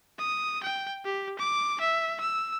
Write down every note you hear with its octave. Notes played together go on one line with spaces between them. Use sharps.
D#6
G5
G4
D6
E5
E6